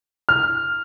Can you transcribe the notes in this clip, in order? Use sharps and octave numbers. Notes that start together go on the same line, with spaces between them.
F6